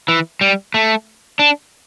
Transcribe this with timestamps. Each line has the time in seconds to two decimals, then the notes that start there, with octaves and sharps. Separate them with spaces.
0.08 E3
0.41 G3
0.74 A3
1.39 D4